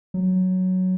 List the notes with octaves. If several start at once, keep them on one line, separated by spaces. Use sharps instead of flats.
F#3